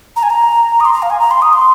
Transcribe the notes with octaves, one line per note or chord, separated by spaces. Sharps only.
A#5
G#5
A#5
D#6
C6
A#5
F5
G#5
A#5
C6
D#6
C6